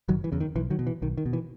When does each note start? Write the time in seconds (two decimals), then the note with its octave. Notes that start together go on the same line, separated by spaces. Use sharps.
0.08 F#1 D#3 F#3
0.24 E3
0.32 E2 C#3
0.40 D#3
0.55 B1 E3
0.70 D#3 F#3
0.79 B2
0.87 E3
1.02 B1 D#3
1.18 D#3
1.26 B2
1.33 E3